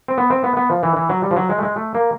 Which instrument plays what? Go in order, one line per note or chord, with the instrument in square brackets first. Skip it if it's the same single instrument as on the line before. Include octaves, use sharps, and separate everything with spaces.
[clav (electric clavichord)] C4
B3
C4
B3
B3
F3
E3
E3
F#3
G3
F3
F#3
G#3
A3
G#3
A3
A#3